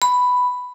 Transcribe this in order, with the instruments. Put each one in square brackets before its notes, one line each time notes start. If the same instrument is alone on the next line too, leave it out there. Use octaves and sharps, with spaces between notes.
[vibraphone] B5